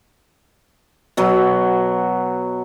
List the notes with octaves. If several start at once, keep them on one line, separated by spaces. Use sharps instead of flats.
B2 F#3